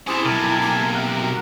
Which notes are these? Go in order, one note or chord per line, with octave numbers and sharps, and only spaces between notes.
C4 C#4 E4 G4 G#4 A5
B1 C3 A#4 G#5 A5
A#3
A#4 F#5
F#4